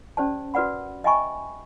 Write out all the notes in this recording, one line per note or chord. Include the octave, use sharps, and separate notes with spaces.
C#4 G4 C5 D5 A5
F#4 A#4 B4 D5 F#5 B5
D#5 E5 G5 G#5 B5 C#6